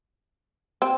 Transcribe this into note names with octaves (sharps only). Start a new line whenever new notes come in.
C4